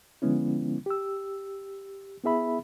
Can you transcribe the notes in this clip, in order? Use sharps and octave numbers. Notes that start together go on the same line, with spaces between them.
D3 F3 G#3 B3 C#4 E4
G4 E6
B3 E4 G#4 E5 B5